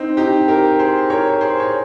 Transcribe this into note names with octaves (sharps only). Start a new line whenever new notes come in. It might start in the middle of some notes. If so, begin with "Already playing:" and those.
Already playing: C4 D#4
D#4 G4
G4 A#4
G#4 C5
A#4 C#5
C#5
G#4 C5
C#5